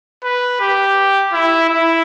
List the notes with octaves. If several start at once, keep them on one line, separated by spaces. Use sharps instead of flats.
B4
G4
E4
E4